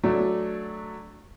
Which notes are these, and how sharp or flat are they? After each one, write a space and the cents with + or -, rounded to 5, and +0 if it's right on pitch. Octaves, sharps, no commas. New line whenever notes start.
F#3 -10 A3 -10 D4 +0